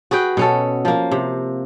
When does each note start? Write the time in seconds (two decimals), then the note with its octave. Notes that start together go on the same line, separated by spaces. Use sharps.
0.11 F#4 G#4 B4 G5
0.37 B2 C#4 A4
0.85 F3 A#3
1.12 C3